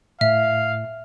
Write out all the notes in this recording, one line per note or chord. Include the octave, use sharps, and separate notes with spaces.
A2 E5 F5